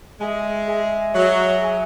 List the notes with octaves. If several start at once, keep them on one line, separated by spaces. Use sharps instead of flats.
G#3 G#4 E5 G#5
G#4 E5 G#5
F#3 G#4 E5 G#5
G#4 E5 G#5